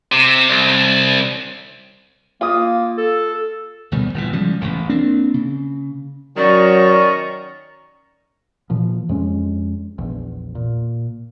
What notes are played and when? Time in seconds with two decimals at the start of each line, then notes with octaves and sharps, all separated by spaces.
0.12 C3
0.48 C2
2.41 A#3 F4 D#6
2.98 A4
3.92 D2 B2 D#3 G3
4.14 G1 A#2 D#3 E3
4.33 C#3 F3 G3 G#3
4.60 D#1 A1 E2
4.89 A#3 C4 D4
5.34 C#3
6.37 D#3 F#3 C#4 D5 A#5 C#6
8.70 A#2 E3 F3
9.09 F2 G#3 C#4
9.98 A#1 E2
10.55 A#2